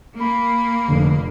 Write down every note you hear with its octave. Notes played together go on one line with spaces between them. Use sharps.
A#3 B5
F1 D3